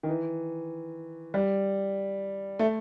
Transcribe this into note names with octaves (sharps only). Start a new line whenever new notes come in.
D#3
E3
G3
A3